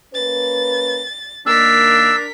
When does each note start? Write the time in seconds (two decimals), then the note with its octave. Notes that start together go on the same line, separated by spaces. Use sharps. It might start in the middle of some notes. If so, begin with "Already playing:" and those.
0.14 A#3 C#4 B4 A6
1.46 D#3 A#3 D4 A#4 E6 B6